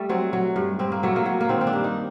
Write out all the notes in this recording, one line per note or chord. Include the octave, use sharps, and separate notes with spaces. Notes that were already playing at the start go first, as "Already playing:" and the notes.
Already playing: G3 A3
F#3 C4
F#3
G2
G2 C4
A#3
F#3 A3
A#3
F#3
A#3
D#3 C4
C4
D4
G2
D#4